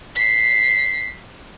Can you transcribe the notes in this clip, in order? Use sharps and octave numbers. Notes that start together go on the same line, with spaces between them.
B6 C7